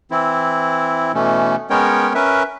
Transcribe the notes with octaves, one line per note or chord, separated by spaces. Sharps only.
E3 C4 E4
B2 E3 A3 C#4
G#3 B3 C#4 A#4 C#5 G5
C#4 A#4 B4 E5